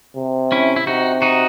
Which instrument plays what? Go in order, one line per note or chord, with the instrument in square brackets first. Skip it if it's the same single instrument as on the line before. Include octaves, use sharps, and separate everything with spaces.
[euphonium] C3
[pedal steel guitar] C#4 E4
E4
[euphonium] C3 [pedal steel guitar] D#4 F#4
[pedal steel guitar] D#4 F#4